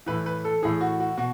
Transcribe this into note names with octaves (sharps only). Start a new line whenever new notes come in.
A2 E3 B4
B4
A4
A2 E3 G#4
F#4
F#4
B2 F#4